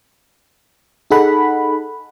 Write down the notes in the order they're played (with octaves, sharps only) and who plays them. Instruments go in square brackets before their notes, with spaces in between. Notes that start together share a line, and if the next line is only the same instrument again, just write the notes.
[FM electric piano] D#4 G#4 A4 F#5 B5